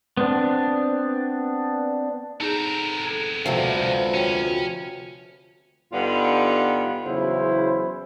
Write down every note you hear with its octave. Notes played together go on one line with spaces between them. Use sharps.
B3 C4 D4
B3 C4 D#4 G#4 A4 A#5 G6
A4 G#6
D2 C3 F3 B4 F5
C#4 F#4 C#5 G5
G2 D3 B3 D#4 F4
E2 C#3 F#3 E4 F#4 C5